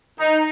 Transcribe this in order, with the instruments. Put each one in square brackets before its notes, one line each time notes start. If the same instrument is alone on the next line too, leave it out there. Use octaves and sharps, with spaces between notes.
[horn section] D#4